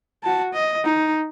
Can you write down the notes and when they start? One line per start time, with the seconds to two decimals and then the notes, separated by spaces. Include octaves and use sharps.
0.23 F#4 A5
0.53 D#5
0.85 D#4